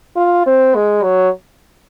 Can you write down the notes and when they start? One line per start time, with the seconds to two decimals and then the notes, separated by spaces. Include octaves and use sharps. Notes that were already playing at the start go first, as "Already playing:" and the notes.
0.16 F4
0.46 C4
0.75 G#3
1.03 F#3